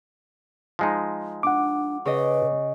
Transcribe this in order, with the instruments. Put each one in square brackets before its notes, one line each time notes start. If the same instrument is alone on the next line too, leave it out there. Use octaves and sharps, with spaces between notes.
[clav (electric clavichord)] F3 G#3 D#4
[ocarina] D4 [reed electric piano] F#5 D6
[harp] C#3 D#5 [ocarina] B4